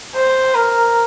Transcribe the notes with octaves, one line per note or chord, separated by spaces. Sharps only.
C5
A#4